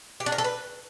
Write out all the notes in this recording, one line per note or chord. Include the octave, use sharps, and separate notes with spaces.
G4
D4
A#4
A4
B4